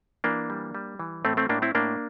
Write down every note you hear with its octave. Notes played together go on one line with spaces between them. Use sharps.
E3 A#3 D4
G3
G3
E3
A2 A3 C4
A3 C4
A2 A#3 D4
C4 E4
A2 A#3 D4